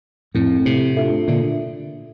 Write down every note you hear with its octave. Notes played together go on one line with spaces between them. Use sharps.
F2 A2 C4 E4 A4
A2 C3
D4 F4 A4 E5
A#2 D3